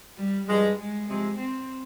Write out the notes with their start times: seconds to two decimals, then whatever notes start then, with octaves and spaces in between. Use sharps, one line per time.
0.18 G3
0.48 G2 F3 G3 G#3
0.79 G#3
1.08 C3 F3 G#3 C4
1.39 C4